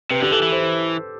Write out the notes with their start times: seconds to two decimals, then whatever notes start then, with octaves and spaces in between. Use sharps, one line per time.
0.11 C3 B4
0.21 D3 G4
0.31 E3 A4
0.42 E3
0.52 C5